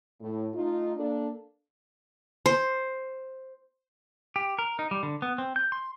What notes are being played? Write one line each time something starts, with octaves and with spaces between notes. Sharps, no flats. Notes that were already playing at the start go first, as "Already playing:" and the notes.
A2
A3 D#4 F4
A#3 D4 A4
C5
G4
A#4
D#4
G3
D3
B3
C4
G6
C6